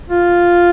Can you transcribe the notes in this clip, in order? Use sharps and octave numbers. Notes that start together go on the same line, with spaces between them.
F4